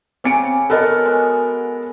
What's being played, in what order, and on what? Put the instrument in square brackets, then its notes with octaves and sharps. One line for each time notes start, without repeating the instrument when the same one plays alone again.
[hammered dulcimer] C#3 C#4 D6 [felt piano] C4 C#7 D7
[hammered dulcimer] B3 F#4 [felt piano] A4 A#4 D#5
[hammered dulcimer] G#3